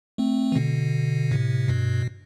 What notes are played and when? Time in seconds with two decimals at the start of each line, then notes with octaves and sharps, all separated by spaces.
0.18 A3 C4
0.52 E3
0.56 B2 D3
1.31 A2 C3
1.68 G2 B2